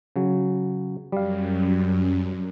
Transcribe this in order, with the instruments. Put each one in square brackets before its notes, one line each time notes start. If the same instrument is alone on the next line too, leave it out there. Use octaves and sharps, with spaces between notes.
[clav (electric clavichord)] C#3 F#3
[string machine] F#2 [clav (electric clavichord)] G3 F5